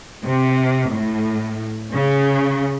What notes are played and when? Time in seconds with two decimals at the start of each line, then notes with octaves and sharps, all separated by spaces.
0.24 C3
0.89 A2
1.93 C#3